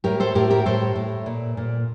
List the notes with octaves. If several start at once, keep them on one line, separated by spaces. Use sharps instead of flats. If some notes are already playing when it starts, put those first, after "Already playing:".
A2 G4 A#4
A4 C5
A2 G4 A#4
G4 A#4
A2 A4 C5
A2
A#2
A#2